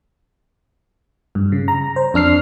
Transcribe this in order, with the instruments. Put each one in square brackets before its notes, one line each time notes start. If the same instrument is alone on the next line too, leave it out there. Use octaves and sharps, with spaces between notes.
[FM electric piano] G2
C#3
A#5
C5
F2 D4 F6 C7